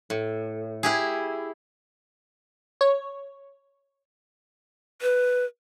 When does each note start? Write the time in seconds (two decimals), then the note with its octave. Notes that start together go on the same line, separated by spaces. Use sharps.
0.10 A2
0.83 E4 G4 G#4
2.81 C#5
5.02 B4